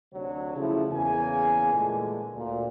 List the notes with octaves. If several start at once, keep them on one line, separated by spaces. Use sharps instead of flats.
D2 C3 F#3 D4 C#5
C#3 F3 F#3 A3 E4
E2 C#3 A#3 G#5
A#2 D3 E3 G#3 A3
D2 A#2